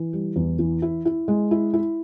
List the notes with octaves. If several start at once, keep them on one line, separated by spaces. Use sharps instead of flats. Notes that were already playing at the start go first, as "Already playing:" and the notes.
Already playing: E3
G3
E2
E3
E4
E4
G#3
E4
E4